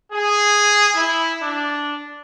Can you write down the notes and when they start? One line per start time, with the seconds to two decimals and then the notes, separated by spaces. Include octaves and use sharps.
0.12 G#4
0.95 E4
1.42 D4